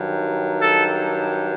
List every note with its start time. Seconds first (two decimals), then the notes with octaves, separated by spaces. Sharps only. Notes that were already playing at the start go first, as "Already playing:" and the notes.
Already playing: G2 D#3 F#3
0.61 A4